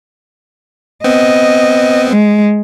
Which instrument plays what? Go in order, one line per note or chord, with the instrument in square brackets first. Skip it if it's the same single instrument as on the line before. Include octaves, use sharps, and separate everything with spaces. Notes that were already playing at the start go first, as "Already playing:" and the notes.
[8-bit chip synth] B3 C4 [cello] D#5
[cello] G#3